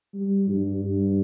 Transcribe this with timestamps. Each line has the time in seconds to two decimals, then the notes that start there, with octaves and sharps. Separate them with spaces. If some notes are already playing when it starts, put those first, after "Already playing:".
0.14 G3
0.49 G2
0.84 G2